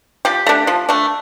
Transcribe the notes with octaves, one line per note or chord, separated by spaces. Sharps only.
F3 G4
A3 D4
F3
A3 D4